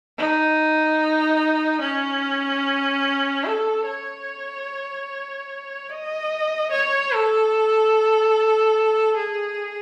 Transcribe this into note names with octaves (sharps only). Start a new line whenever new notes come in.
D#4
C#4
A4
C#5
D#5
C#5
A4
G#4